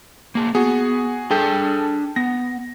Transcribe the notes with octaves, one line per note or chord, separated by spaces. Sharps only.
A#3 G#4
B3 F#4 G#4
D4 G#4 A4 G5 A5 G6
B3 A#6